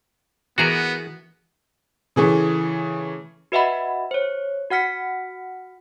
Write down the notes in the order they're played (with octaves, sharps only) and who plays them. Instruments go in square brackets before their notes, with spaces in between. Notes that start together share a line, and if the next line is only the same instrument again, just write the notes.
[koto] E3 F#5 A#5 [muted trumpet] B3 [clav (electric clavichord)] F#4 G#4 A#4
[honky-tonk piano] C#3 E3 A3
[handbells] F#4 B4 D#5 E5 F#5 B5
C5 C#5
F#4 F#5 F6 B6 C#7